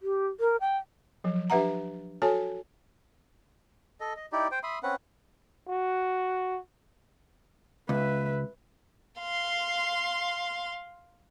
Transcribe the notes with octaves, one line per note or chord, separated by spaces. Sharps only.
G4
A#4
G5
F3 F#3
D4 G4 B4 E5 F#5 A#5
F#4 A4 C#5 G#5 A5
A4 D#5
D#5
D#4 E4 G4 D5
C5 G5
E5 B5 C6 D#6
C4 C#4 B4 F#5
F#4
C#2 B4 E5
F5 C6